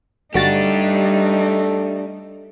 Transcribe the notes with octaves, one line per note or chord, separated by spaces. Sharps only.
G1 G3 A3 D4 D#4 F#4 G4 A6